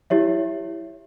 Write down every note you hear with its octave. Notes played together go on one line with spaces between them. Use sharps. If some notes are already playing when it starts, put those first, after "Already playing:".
E4 G4 C#5 E5